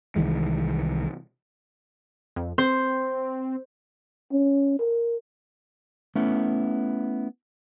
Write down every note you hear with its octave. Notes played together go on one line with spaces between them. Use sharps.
C2 D#3 E3 G#3
F2
C4 C5
C#4
A#4
A3 B3 C#4 E4